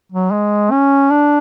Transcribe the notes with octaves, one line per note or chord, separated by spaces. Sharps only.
F#3
G#3
C#4
D4